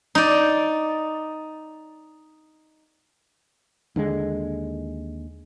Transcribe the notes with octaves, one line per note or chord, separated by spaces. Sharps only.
D#4 D5
D#2 D3 F3 G#3